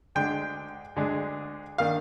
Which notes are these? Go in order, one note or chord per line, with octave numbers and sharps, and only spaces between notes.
D2 D3 G#3 D4 G5
D2 D3 G#3 D4
D#3 A#3 D4 F5